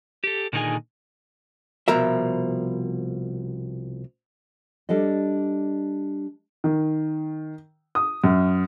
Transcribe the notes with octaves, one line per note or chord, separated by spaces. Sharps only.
G4 A4
A#2 D3 D#3 D#4 G#4 G#5
C2 B2 F3 A#4 E5
G3 D4 A4 D#5
D#3
D#6
F#2